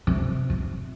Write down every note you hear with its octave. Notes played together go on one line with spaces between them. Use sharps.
C3
C3